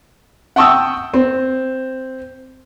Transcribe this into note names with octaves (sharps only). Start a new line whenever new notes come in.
F#5 G5 A5 C#6 D#6 E6
C4